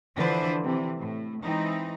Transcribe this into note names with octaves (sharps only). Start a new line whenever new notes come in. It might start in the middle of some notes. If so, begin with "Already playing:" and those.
D3 E3 F3 D4 B4 C5
C3 E3
A2
E3 G#3 C4 D#4